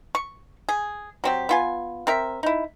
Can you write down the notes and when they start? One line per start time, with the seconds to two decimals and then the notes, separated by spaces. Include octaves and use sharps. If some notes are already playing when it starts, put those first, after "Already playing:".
0.15 C#6
0.69 G#4
1.24 F#3 C4 G4
1.49 B3 F4 G#5
2.07 C4 A#4 E5
2.43 D#4 E4